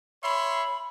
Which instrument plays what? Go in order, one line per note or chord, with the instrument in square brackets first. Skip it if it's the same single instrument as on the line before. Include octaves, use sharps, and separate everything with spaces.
[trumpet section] C#5 E5 C6 [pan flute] B5